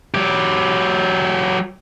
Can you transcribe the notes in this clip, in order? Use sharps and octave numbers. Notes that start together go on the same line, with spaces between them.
F#3 G4